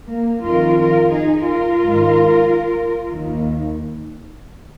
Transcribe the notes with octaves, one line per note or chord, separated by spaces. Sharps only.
A#3
F2 D#3 F4 A#4
F4 A#4
D#4 G#4
F4 A#4
G#2 D#3
D#2 D#3